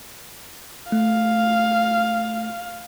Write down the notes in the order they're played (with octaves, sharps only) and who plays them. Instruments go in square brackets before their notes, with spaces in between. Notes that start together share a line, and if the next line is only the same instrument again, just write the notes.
[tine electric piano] A3 [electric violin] F5